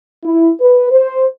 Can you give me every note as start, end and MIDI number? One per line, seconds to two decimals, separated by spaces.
0.24 0.50 64
0.60 0.89 71
0.91 1.27 72